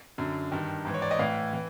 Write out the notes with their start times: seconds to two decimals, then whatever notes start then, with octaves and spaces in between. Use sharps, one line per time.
0.18 F#2 D3
0.52 G2 D#3
0.85 G#2 E3
0.94 C#5
1.02 D5
1.11 D#5
1.19 A2 E3 F5
1.53 E3